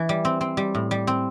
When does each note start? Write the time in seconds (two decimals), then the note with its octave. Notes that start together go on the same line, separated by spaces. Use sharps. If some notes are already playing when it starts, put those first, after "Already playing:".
Already playing: E3
0.09 G3
0.25 C4
0.41 C4
0.57 G3
0.75 A2
0.91 G3
1.07 C4